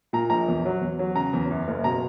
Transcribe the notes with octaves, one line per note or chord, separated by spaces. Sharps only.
A#2 A#5
A#1 A#5
E2
F#3
E2
F#3
C#3 A#5
E2
F#2
F#1
B2 A#5